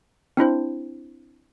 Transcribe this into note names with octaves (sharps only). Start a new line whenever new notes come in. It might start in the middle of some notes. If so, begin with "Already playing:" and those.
C4 D4 E4 C5